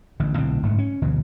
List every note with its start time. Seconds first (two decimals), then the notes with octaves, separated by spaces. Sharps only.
0.20 A1 D3
0.37 B1 A2 D3 C4
0.63 F#1 G#2 A3
0.78 C#4
1.02 G1 D2 B2 E3